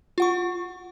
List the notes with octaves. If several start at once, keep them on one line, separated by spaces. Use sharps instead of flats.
F4 F#5 C#6